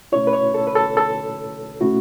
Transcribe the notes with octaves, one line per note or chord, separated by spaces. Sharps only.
B2 A3 C#4 E4 C#5
B4
C#5
A4
B4
A4
A4
B2 A3 C#4 E4 F#4